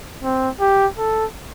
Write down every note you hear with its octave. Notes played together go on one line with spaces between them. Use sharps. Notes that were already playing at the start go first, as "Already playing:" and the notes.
C4
G4
A4